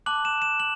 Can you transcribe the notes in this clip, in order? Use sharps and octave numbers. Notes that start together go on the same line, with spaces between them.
A5 D6 F#6 F#7
E7
E7
F#7